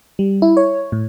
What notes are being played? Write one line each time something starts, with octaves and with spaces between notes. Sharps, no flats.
G3
E4
C#5
A2